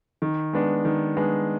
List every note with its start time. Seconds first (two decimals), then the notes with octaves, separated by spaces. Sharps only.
0.22 D#3
0.53 G#3 B3 D4
0.85 D#3
1.17 G#3 B3 D4